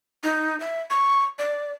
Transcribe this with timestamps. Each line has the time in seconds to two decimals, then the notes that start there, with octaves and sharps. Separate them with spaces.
0.23 D#4
0.60 E5
0.90 C#6
1.39 D5